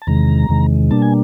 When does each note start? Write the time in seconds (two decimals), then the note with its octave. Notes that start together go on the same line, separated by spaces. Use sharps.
0.02 A5
0.07 E2 C3 D#3 G#3 A#5
0.49 E2 C3 D#3 G#3
0.91 B2 G3 A#3 D4 A5
1.02 G#5